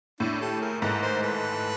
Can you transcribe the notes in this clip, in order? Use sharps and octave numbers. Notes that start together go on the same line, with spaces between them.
A2 D4 E4
G4 A4
G#4 A#4
G#2 A4 B4
A#4 C5
A4 B4